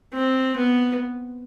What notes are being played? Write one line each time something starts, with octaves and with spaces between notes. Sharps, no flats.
C4
B3